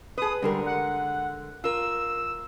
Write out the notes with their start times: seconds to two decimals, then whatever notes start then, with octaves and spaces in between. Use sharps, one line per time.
0.18 G#4 B4 D#6
0.42 D3 G3 G#3 A#4
0.66 F#5
1.64 F4 A#4 E6